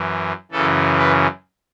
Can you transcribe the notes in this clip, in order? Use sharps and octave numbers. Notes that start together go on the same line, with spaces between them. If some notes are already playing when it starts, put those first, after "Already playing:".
Already playing: F#2 E3
F#2 C#3 E3 A4
B4